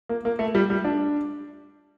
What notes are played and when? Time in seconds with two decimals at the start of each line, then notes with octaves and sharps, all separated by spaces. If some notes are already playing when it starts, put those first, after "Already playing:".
0.09 A#3
0.25 A#3
0.39 A3
0.55 G3
0.70 G3
0.84 D4